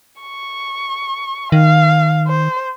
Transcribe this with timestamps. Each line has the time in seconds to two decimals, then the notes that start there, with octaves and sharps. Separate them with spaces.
0.21 C#6
1.52 D#3 F5
2.27 C5